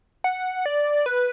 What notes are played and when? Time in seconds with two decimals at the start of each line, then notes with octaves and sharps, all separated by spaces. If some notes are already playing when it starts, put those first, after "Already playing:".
0.24 F#5
0.66 D5
1.06 B4